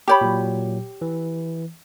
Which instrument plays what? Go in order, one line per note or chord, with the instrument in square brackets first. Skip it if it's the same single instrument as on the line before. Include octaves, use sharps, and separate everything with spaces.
[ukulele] G4 C#5 B5
[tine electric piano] A#2 F#3
E3